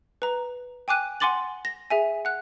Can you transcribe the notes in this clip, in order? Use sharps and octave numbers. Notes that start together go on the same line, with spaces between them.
B4 A#5
G5 G#5 D6 F#6 D#7
F#5 G#5 C6 D6 A6 F#7
A#6
G#4 E5 G#5
F#5 F#6